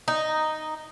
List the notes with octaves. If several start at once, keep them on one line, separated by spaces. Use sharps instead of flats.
D#4